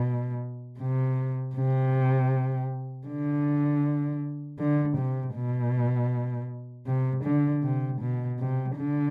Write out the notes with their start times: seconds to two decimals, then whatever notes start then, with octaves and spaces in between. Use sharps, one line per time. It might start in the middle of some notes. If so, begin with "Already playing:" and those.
Already playing: B2
0.79 C3
1.56 C3
3.07 D3
4.59 D3
4.97 C3
5.35 B2
6.87 C3
7.24 D3
7.63 C3
8.01 B2
8.39 C3
8.77 D3